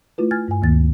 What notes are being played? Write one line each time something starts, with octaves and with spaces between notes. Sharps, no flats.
A3 E4 F4 B4
G#5 F6 G#6 A6
G2 G#5
D2 D#3 A#3 A6